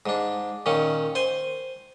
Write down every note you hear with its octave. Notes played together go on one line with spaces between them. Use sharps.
G#2 D4
A#2 D#3 C#4
C5 G#5